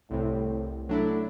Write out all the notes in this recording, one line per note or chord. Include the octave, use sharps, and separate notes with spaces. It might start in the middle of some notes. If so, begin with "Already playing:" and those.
C2 A2 C3
F#3 A3 D4 E4